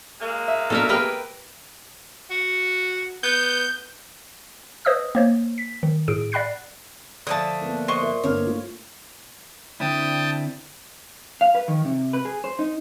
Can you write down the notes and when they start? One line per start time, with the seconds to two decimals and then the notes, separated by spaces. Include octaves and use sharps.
0.19 F#3 G#3 A#3
0.48 E5
0.70 B2 A3 D4 A4 A#4 E5
0.89 B3 G4 G#4 A#4 B4 G5
2.30 F#4
3.23 B3 G6
4.85 B4 C5 D#5 D#6 E6
5.15 A#3 C5 C#5
5.58 B6
5.83 D#3
6.08 A2 G#4 D7
6.32 D5 F#5 B5 F#6 C7
7.27 D3 F3 A3 A5 D#6
7.61 A#3 B3
7.88 C5 D#5 C#6
8.02 A#4 E5
8.24 G1 A#3 C#5 F6
8.46 A3 F4
9.80 D3 C4 D4 E4 G5 A5 D#6
11.41 F5
11.55 B4
11.68 D#3
11.85 C3
12.13 B4
12.25 G#4
12.44 C5
12.59 D#4